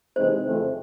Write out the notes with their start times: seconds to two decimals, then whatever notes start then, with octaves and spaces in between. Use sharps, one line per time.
0.16 C3 E3 G#3 C4 D#4 C5
0.46 F2 C#3 E3 A3 C4